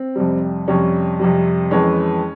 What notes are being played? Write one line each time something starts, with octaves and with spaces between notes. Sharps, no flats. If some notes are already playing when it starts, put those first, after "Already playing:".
Already playing: C4
F2 C3 G3
F2 C3 G3 C#4
F2 C3 G3
F2 E3 G#3 C#4